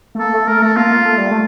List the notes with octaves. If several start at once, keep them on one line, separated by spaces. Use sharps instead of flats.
A3
A#3 A4
A3
A3 A#4
A3 A4
A#3 F4
A#3
A3
G3
A3